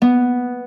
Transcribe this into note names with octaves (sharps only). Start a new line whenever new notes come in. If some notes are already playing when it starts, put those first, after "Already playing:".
B3